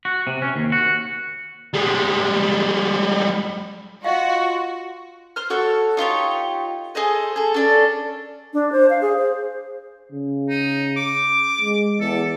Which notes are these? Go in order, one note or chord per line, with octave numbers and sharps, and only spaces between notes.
F#4
C3
C#4
D#2
F#4
G3 G#3
F4 F#4 D#5 F5
C5 F6
F#4 A4 C#5 E6
D#4 F4 G4 C#5
G#4 A4 C5 D#5
G#4 A4
C#4 D4 A4
D4
C5
F5
G#4
C5
C#3
D#4
D6
G#3
E2 A4